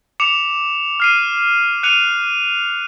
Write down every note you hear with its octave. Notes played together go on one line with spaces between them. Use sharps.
D6 C#7 E7 F7
F6 C7 D#7
F#6 C#7 D#7 F7